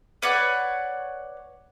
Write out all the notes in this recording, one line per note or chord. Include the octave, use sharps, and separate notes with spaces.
B4 C#5 D5 F#5